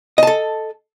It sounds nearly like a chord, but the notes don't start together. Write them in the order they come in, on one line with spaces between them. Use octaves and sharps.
D#5 A5 A4